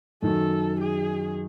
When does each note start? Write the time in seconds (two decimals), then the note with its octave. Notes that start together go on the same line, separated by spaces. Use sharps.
0.22 F#2 D#3 F#3 A4
0.80 G#4